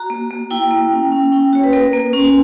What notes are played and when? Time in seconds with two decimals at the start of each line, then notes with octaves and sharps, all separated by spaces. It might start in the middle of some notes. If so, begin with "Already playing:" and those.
Already playing: F#4 A#5
0.10 A#3
0.30 A#3
0.51 E4 G5
0.71 A#3
0.91 C#4
1.12 C#4
1.32 C#4 G5
1.53 F#4 C#5
1.64 B4
1.73 A#3 A#4
1.93 A#3
2.13 C#4